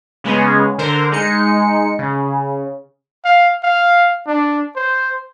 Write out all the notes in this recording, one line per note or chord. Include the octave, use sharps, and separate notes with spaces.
C#3 G#3 B3 C#4 G#4
D3 A#4 C5
G#3 D#4 C#7
C#3
F5
F5
D4
C5